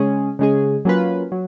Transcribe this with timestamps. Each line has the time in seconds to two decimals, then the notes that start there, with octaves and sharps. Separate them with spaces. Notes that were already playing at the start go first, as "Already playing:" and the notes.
Already playing: C#3 G#3 C#4 G#4
0.39 C#3 G#3 C#4 G#4
0.85 F#3 A#3 C#4 F4 B4
1.32 F#3